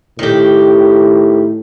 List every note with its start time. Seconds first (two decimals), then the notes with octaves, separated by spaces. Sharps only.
0.19 A2 D#3 G4